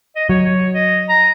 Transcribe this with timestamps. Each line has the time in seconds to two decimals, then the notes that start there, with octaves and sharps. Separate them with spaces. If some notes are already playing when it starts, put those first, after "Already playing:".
0.16 D#5
0.29 F#3 C#5
0.45 C#5
0.74 D#5
1.09 A#5